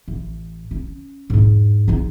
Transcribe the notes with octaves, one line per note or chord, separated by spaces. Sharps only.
A1
C#4
E2 G#2
E2 D#4